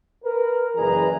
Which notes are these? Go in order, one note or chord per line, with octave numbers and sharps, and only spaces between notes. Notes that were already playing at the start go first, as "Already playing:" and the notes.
A#4 B4
F#1 E3 G#4 B4 D5 A#5